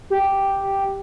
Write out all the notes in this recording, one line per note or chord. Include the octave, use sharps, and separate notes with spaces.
G4